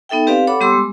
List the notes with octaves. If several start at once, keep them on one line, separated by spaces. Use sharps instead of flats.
B3 D#4 A4 E5 G5
C4 G4 B4 D5 F5
A4 C#5 F#5 B5 D6
G3 B3 G4 C6 D6 E6
G#3